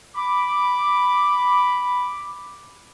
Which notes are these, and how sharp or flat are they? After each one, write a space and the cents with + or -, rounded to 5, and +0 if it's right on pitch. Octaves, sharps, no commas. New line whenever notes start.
B5 +0 D6 +0